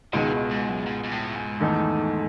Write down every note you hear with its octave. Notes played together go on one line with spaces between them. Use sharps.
C#2 B2 D#3 G#3
A2
G#2
F#2
G#2
G#2
A2
G#2
E2 D#3 A3 D#4 A4